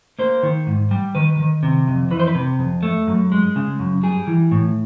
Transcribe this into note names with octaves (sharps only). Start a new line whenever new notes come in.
A#3 C5
D#3
G#2
G3
D#3 B4
D#3
C3
F2
E3 B4
C5
B4
C3
F2
A3
F#2
G#3
C#3
F#2
G3 G#4
E3
A2